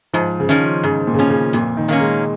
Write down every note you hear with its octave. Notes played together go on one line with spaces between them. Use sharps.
G#2 F3
C#3
D#3 F3 C#4
G#2 C#3
A#2
C#3
A#2 F3 C#4
C#3
F2 A#2
D#3
D#3 A#3 C#4
G#3